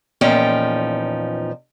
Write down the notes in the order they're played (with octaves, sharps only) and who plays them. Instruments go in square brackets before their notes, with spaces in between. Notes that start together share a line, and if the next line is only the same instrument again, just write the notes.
[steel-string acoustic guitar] E2 A#2 F3 C#4 D#4 G5